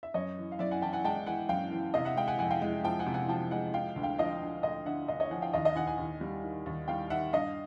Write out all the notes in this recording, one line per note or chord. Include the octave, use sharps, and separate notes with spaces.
E5
F#2 C#5 D#5
E3
F5
F#2 D5 E5
F#5 G#5
E3 G5 A5
F#5 G#5
G#3 G5 A5
E3 F#5 G#5
F#2 F5 G5
E3
C3 D#5 F5
E5 F#5
G#3 F5 G5
F#5 G#5
F2 F#5 G#5
F5 G5
G#3
F3 G5 A5
F#5 G#5
C3
F#5 G#5
F3 G5 A5
G#3 F#5 G#5
F3 F5 G5
D2
F5 G5
F3 D#5 F5
D3
D2 D#5 F5
D3 E5 F#5
D2 D#5 F5
C#5 D#5
F3 F#5 G#5
F5 G5
D#2 D#5 F5
D#5 F5
D#2 F#5 G#5
F#5 G#5
D#2
G3
D#3
D#2
G3 F5 G5
D#3 E5 F#5
G2 D#5 F5